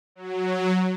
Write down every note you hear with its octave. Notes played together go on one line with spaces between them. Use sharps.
F#3